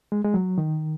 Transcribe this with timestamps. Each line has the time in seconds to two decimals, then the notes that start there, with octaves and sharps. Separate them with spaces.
0.12 G#3
0.25 G#3
0.34 F#3
0.58 D#3